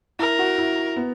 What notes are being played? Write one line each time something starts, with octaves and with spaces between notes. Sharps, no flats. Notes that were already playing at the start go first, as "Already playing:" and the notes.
E4 A#4
F#4
E4
B3